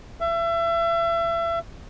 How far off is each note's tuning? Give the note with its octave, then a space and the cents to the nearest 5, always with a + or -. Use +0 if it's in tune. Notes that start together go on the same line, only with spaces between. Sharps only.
E5 +30